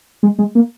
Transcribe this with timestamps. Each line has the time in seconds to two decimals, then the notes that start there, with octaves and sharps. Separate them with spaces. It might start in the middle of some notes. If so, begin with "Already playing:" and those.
0.23 G#3
0.39 G#3
0.55 A#3